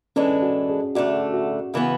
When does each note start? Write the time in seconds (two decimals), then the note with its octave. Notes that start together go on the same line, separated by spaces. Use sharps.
0.16 E3 G#3 C#4 D4 A4
0.42 F#4
0.70 G#4
0.95 D2 D3 A3 D4 F#4
1.34 F#4
1.74 C#3 E3 B3